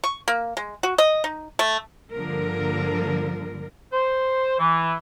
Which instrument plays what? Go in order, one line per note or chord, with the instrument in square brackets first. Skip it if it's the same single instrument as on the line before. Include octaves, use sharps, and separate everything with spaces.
[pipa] C#6
A#3
G#3
F#4
D#5
D#4
A3
[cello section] G2 D3 F3 A#3 A#4
[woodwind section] C5
E3